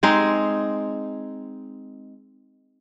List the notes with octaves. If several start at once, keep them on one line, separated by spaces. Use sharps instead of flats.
G#3 C4 D#4 G#4